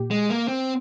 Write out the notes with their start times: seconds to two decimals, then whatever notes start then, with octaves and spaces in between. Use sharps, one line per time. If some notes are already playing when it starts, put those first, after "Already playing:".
Already playing: A#2 G4
0.11 G#3
0.29 A#3
0.48 C4